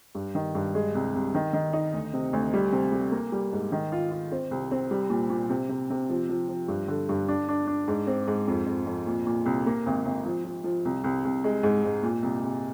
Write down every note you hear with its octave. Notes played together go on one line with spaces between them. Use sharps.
G2
D#3
G2
G#3
C2
C2
D#3
D#3
D#4
D2
C3
D2
G3
C3
G3
A#3
G3
G#2
D#3
F4
F4
C4
C2
C4
G3
A#2
A#2
C3
C3
C3
F3
F3
F3
G2
D3
G2
D4
D4
D4
G#2
C4
G#2
F2
F2
F2
A#2
A#2
C2
A#3
G#1
G#1
F3
F3
F3
C2
C2
C2
G#3
G#2
G#2
A#2
C2
C2